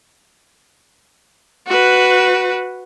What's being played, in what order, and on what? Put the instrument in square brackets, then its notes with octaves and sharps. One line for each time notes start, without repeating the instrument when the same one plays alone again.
[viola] F#4 B4